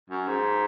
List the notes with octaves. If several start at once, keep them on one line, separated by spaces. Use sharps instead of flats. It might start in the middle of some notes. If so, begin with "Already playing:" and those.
F#2
G#2